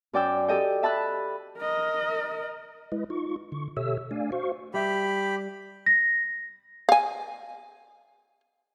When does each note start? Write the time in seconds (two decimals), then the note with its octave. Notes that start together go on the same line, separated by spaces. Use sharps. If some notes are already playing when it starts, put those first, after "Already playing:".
0.13 F#2 D5 G5 E6
0.48 G4 A4 D#5 G5
0.83 E5 A5 B5 E6 F#6
1.58 A#4 D#5
2.92 G#3 E4 B4 D#5
3.10 D#4 F4 C#6
3.52 D3 C#6
3.77 B2 G4 A4 C#5 E5 E6
4.11 A3 D4 D5 F5 G#5
4.32 F#4 C5 F5 C#6
4.74 G3 G4 E5 B5
5.86 A#6
6.89 F5 G#5